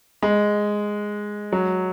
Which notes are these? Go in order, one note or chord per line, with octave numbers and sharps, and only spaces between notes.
G#3
F#3